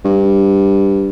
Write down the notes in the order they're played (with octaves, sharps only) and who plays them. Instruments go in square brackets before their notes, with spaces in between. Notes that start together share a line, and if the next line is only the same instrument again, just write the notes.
[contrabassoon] G2